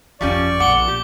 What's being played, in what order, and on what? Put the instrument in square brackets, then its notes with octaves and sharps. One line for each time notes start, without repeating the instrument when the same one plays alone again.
[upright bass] G1 F2 [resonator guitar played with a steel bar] F3 G3 C#4 [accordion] D5 C#6
[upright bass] A#1 B3 [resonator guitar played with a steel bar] F#5 [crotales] D6 G7
[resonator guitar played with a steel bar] G4